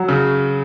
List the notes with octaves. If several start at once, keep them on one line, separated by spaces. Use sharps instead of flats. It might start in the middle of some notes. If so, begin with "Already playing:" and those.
Already playing: F#3
C#3